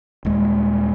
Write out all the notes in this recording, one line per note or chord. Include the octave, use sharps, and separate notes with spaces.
D#1 G#3